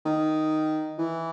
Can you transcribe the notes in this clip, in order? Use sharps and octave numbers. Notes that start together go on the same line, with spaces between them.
D#3
E3